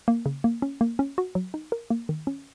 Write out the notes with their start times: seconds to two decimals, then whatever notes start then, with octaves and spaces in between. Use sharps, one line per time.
0.08 A#3
0.26 C#3
0.44 A#3
0.62 C#4
0.81 A#3
0.99 C#4
1.18 F#4
1.35 F#3
1.54 D#4
1.72 A#4
1.90 A#3
2.09 D#3
2.27 C#4